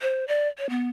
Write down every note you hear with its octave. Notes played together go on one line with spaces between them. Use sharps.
C5
D5
C#5
B3